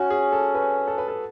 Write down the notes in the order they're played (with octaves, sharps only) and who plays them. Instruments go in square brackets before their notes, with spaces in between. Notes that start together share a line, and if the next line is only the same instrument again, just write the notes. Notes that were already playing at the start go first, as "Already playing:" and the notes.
Already playing: [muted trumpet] C#4 [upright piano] F#4
[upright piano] G#4
A4
B4
A4
B4
A4